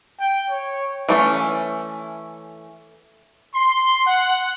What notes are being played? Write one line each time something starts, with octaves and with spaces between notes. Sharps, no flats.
G5
C#5
E3 A3 C#4
C6
F#5